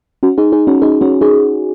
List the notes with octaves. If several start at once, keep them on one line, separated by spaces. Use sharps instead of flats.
C#4 F#4
D#4 G#4
D#4 G#4
C#4 F#4
D#4 G#4
C#4 F#4
D#4 G#4